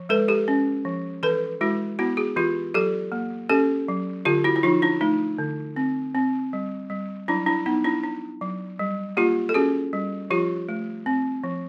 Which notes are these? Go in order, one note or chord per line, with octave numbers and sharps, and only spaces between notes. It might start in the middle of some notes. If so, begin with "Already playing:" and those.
Already playing: F3
G#3 A4 B4
G4 A4
C#4
F3
E3 A4 B4
G#3 E4 F#4
B3 E4 F#4
F#4 G#4
E3 F4 G4
F#3 G4 A4
A#3
C#4 G4 A4
F#3
D3 F4 G4
E4 F#4
E4
F3 D#4 F4
D4 E4
A3 D#4
D3
C4
C4
G3
G3
F#3 D4 E4
D4 E4
B3 D#4
D4 E4
D4
F#3
G3
A#3 F4 G4
A4
C#4 F#4 G#4
G3
F3 F4 G4
A3
C4
F3